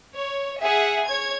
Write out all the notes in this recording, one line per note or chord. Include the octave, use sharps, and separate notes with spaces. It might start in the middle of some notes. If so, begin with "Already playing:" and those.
C#5
G#4 E5 F#5
C#5 G#6